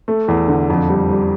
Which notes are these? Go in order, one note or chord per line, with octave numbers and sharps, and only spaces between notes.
A3
E2
D3
F2
G3
G3